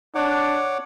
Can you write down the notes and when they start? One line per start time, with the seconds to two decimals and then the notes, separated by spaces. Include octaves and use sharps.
0.15 D4 C#5 F#5 D6